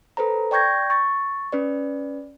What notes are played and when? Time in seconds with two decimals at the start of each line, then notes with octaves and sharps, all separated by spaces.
0.17 A4 B4 C5 A#5
0.51 D5 G5 C#6 G6 G#6 A#6
0.90 C#6 A6
1.52 C#4 B4 D5